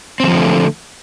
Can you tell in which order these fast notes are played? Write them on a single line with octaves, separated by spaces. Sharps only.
C4 E3 F3 D3 A3